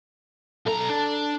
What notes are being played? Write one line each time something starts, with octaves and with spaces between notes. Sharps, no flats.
B1 A4 A#5
D4